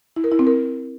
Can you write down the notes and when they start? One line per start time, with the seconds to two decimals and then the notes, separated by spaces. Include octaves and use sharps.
0.16 E4
0.24 A#4
0.32 E4
0.39 C4
0.47 A#4